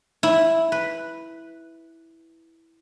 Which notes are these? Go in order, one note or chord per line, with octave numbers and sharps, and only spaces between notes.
E4
B4